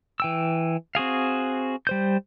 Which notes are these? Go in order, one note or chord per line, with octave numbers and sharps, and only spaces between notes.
E3 G5 E6
C4 F#4 G#4 F5
G3 C5 G6